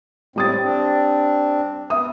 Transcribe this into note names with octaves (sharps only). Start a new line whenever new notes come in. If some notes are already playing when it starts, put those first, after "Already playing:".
A2 G3 C4 D#6 A6
C4 D4
B3 E5 D#6